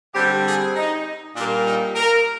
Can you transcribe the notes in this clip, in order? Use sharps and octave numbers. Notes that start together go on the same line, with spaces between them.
D3 G3 C4 G4
G#4
D#4
A#2 G3 A#3 D4
D#4
A#4